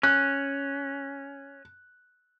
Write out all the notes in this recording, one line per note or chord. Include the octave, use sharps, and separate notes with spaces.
C#4 F#6